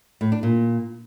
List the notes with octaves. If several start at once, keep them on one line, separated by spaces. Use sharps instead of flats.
A2
D4
A#2